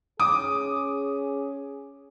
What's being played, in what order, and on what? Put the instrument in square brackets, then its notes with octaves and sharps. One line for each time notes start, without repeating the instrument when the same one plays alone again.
[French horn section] C#4 G#4 [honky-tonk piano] D6 D#6